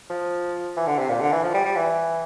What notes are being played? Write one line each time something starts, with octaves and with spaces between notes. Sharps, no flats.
F3
E3
D3
C3
A#2
D3
E3
F3
G3
G3
E3